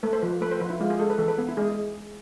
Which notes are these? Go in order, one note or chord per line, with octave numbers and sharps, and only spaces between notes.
A3 B4
C5
F3 B4
A3 B4
C5
F3 B4
E4
G#3 F4
G#4
G#3 A4
B4
E3 A4
B4
B3
E4
G#3 G#4